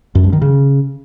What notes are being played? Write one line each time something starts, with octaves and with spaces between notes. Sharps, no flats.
F#2
G2
D#3
C#3